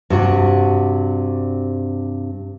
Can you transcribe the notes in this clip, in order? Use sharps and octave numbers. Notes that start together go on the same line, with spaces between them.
G2 C3 F#4